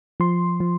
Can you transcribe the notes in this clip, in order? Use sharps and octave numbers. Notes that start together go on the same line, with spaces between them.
F3 C6
F3